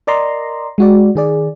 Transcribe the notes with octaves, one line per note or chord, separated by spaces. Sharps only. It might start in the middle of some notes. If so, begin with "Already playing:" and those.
A#4 D5 D#5 A#5 C6
G#3 F#4 D5
D#3 G#4 D5